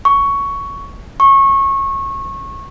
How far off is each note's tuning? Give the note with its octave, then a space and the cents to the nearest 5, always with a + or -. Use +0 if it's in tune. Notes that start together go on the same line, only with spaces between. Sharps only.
C#6 +10
C#6 -20